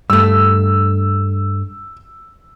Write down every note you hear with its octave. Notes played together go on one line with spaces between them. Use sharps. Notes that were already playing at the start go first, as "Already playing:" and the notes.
G2 A3 E6